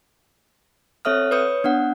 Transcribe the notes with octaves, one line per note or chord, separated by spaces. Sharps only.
C4 A4 C#5 E5 D#6 F6
B4 C#5 D#6 G6 C#7
B3 D4 F#5